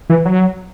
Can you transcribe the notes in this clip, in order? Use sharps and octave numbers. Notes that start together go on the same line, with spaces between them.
E3
F#3